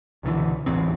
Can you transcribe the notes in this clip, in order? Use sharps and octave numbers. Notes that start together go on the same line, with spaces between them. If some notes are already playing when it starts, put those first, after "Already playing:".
C#2 B2 D3 E3
D1 A1 E2 C4